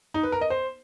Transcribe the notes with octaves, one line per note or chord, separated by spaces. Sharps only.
D#4
B4
A#4
D#5
C5